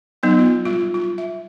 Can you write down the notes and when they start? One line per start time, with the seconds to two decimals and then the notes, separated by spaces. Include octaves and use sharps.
0.23 F#3 B3 D#4 F#5
0.39 F4
0.65 G3 F4
0.94 F4
1.18 E5